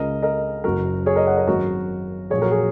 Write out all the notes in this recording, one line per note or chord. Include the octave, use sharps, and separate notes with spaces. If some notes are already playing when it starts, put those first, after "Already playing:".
Already playing: C#2 C#3 G#3 A#4 D#5
A#4 D#5
F#1 F#2 F#3 F#4 A#4
G#4 C#5
A#4 D#5
C#5 F#5
A#4 D#5
G#1 F#2 F#3 F#4 A#4
A#1 A#2 F#3 G#4 C#5
F#4 A#4
G#4